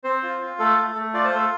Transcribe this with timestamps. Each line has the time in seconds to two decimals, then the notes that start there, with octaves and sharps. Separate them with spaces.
0.04 C4 C5
0.23 F4
0.41 F4
0.59 A3 A4
0.78 A3
0.95 A3
1.14 F4 D5
1.24 C5
1.32 A3 A4